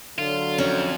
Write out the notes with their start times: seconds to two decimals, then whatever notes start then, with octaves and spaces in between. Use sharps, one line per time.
0.19 D3 F#3 F4
0.58 F2 C#4 A#4